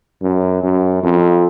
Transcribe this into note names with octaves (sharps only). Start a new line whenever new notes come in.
F#2
F#2
F2